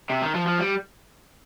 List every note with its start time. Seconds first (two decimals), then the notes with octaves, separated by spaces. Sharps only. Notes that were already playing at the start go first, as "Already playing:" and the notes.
0.10 C3
0.22 D#3
0.34 F3
0.46 F3
0.59 G3